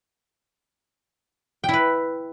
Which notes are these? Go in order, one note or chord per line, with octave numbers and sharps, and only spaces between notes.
E4 B4 G5